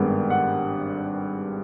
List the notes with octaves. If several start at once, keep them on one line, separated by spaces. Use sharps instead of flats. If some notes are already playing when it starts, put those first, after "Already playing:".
Already playing: G#1 G2 D#3 G#3 B3
F#5